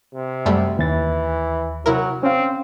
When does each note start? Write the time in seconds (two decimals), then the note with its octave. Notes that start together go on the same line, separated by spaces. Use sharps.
0.15 C3
0.46 F#2 G3 A3
0.79 D#2 E3 A6
1.86 C3 F#3 E4 A#4
2.23 C4 C#4 F5